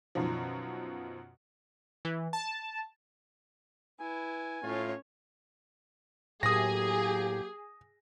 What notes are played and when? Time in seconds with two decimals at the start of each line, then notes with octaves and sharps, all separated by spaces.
0.15 F#2 B2 D#3 F3
2.05 E3
2.33 A5
4.00 E4 B4 G#5
4.64 A2 C#4 F4 C#5
6.43 A2 F#3 A#3 G4 G#4 D#6 A#6